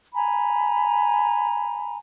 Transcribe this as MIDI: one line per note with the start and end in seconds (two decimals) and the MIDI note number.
0.14 1.97 80
0.14 1.97 82
0.14 1.97 83